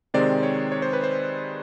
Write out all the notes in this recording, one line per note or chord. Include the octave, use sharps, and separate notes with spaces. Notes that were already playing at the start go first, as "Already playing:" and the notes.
C3 D#3 G#3 C4 D5
C#5
C#5
C5
B4
C5